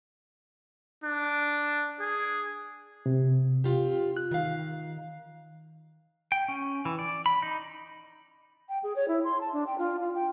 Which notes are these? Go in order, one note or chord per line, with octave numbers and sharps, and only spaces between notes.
D4
G#4
C3
C4 F4 G4
F#6
D#3 F5
G5
C#4
E3
D5
B5
D#4
G5
G#4
C#5
E4
C6
A5
D4
G5
F4
F4
G5